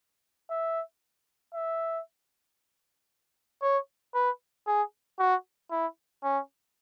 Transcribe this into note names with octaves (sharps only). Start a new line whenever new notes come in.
E5
E5
C#5
B4
G#4
F#4
E4
C#4